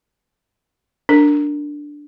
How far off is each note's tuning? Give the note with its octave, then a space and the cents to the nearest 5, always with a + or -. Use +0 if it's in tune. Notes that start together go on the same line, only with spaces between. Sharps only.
D4 +0 A#4 -20